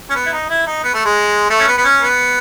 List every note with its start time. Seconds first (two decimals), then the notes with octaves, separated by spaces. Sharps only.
0.10 C#4
0.15 B3
0.26 E4
0.33 D#4
0.49 E4
0.67 D#4
0.84 B3
0.94 A3
1.05 G#3
1.50 A3
1.60 C#4
1.67 B3
1.78 B3
1.84 C#4
2.01 B3